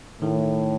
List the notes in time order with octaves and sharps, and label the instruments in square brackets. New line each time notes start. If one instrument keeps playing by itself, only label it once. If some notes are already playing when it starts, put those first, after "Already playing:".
[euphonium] A2 [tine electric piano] D#3